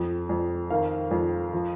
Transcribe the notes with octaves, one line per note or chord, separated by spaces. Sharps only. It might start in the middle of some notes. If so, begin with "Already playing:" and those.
Already playing: F2
F2
D#3 F5
F2
F3